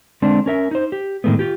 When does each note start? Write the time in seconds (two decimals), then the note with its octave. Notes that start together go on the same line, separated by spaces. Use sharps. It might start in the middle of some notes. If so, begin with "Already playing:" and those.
0.22 D3 G#3 C4 D4
0.46 C#4 A#4 E5
0.71 D#4 C5
0.92 G4
1.24 A2 D#3 G#3 A3 B3
1.39 F4 G4